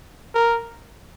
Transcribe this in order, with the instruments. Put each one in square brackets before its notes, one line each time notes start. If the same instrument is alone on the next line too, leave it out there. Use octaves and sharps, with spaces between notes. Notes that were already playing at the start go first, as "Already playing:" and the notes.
[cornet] A#4